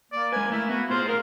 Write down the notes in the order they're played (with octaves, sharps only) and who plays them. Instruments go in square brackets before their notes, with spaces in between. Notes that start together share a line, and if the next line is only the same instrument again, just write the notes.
[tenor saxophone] A#3 [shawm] D5
[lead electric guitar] G#3 B4 [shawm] G#5
[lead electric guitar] A3 [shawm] E4
[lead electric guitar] B3 [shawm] F#4
[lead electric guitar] A2 G#4 [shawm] F4 [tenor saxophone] C5
[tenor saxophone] A#4 [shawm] F5